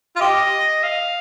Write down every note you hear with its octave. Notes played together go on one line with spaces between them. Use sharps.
F4
G4 D#5
F5